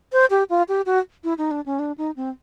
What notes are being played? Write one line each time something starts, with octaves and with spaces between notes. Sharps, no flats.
C5
G4
F4
G4
F#4
E4
D#4
D4
C#4
D4
D#4
C4